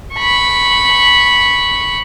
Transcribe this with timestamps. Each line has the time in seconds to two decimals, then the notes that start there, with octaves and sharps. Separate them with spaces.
0.15 B5 C#6